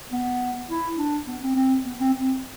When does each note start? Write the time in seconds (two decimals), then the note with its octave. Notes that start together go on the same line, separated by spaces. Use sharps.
0.12 B3
0.69 E4
0.98 D4
1.27 B3
1.42 C4
1.56 C4
1.84 B3
2.00 C4
2.14 C4